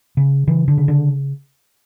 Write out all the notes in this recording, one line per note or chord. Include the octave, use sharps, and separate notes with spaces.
C#3
C#3 E3
D3
C#3
D3